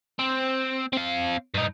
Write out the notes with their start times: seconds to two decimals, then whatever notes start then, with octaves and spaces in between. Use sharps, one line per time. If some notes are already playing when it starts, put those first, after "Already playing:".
0.19 C4
0.93 C4 F5
1.54 G2 D#4